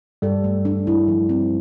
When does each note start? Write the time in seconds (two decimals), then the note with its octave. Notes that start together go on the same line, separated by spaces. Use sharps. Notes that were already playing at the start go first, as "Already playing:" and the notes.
0.22 G2 G3 A4
0.44 A3
0.65 D4
0.87 E4
1.08 F3
1.29 C4